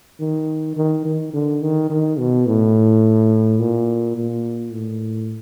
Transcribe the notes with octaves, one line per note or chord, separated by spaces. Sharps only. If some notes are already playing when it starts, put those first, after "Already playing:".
D#3
D#3
D#3
D3
D#3
D#3
B2
A2
A#2
A#2
A2